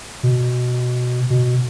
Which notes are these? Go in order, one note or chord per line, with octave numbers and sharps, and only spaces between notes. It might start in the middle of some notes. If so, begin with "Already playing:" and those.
B2
B2